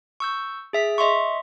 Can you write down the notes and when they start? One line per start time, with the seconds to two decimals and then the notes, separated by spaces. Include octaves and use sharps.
0.20 C#6 E6 G6
0.73 G#4 E5 B6
0.98 D#5 E5 C6 C#6